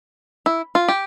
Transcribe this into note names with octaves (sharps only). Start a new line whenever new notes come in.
E4
F4
G4